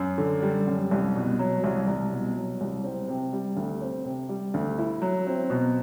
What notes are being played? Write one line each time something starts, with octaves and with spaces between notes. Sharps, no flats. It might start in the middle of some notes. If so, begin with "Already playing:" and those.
Already playing: F#2
D3
G3
F#2
C2
B2
F#3
C2
C2
B2
F#3
C2
C4
C3
G3
D2
C4
C3
G3
D2
E4
F#3
C4
B2